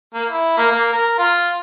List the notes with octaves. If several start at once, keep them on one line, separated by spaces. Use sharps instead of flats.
A#3
E4
A#3
A#3
A#4
F4